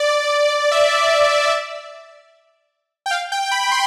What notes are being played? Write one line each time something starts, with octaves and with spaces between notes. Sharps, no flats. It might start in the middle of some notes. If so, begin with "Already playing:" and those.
Already playing: D5
E5
G5
F5
G5
B5
C6